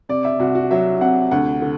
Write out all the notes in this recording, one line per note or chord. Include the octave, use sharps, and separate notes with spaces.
C3 D5
E5
C2 F#4
F#4
F#3 E5
C3 F#5
D2 F#5
D3